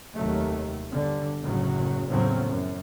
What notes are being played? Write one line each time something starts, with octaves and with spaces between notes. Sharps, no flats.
F1 D#2 F#3 A3
G1 D3
F#1 A2 C#3 F#3
E2 A2 C#3 F3 F#3 C4
F#2